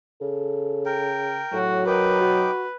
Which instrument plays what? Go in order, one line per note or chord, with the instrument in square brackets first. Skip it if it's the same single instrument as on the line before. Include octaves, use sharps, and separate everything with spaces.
[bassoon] C#3 [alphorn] A4
[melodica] A#4 G5
[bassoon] A2 [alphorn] F#3 [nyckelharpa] F#4
[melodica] D#4 G5 D6 [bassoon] A#4 [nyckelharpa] B4
[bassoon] F#4